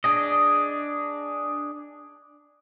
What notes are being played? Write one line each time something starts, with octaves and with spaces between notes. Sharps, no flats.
D4 G#4 D#5